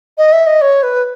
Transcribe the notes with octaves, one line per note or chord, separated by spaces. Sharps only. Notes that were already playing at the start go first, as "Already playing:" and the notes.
D#5
E5
D#5
C#5
B4